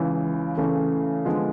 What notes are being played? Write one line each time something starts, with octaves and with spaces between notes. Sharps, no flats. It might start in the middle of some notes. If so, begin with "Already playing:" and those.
Already playing: C#2 C#3 E3
C#3 E3 A3
D3 F3 G#3 B3